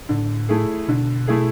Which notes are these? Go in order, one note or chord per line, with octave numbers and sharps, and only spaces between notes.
A2 D3
A3 E4 G#4
B2 D3
A3 E4 G#4